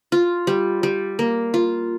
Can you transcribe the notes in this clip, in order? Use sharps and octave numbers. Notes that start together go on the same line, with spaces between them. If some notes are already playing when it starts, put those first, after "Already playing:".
F4
G3
G3
A#3
F4